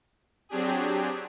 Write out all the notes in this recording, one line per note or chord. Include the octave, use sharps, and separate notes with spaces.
F#3 C4 D4 G4 G#4